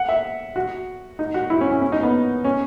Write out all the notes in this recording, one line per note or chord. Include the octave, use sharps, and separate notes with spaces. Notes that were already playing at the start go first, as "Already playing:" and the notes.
Already playing: F#5
E5
F#4
D#4
F#4
E4
C#4
C#4
C#4
D#4
B3
C#4